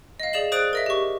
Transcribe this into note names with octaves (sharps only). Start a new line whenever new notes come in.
D#5 F5
G#4 D5 E7 F#7
G#4 C5 D#6 F#6 A6 D7
A#4 D#5 E5
G4 C#6